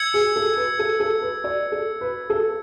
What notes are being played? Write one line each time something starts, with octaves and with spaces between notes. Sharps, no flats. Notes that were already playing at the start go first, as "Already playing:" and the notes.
Already playing: E6 G#6 C#7
G#4
A4
B4
A4
A4
B4
D5
A4
B4
A4